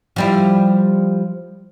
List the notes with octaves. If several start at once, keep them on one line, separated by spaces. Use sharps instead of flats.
F3 G3 E4